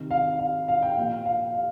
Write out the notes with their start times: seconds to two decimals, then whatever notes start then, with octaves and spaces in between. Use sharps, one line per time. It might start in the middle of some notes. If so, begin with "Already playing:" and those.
Already playing: C3 D#3
0.11 F5
0.39 F5
0.68 F5
0.82 G5
0.97 A#2 F3 F5
1.25 F5
1.54 F5